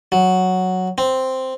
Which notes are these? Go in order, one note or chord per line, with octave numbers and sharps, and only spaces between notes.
F#3
C4